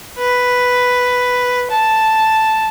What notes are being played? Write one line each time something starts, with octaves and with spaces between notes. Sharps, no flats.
B4
A5